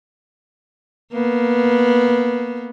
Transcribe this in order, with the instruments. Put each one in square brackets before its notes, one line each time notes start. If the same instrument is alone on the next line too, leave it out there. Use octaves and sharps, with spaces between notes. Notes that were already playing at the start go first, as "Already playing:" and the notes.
[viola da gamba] A#3 B3